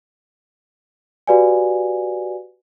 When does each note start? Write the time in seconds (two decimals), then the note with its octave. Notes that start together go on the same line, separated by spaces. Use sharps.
1.27 F#4 G4 B4 D5 F5 G#5